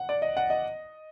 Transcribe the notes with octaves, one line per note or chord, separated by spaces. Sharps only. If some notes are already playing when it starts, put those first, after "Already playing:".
Already playing: F#5
D5
D#5
F#5
D#5